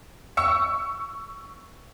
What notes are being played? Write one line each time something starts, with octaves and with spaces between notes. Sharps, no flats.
C#6 E6 C#7